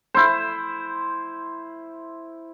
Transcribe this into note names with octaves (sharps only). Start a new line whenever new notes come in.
E4 C5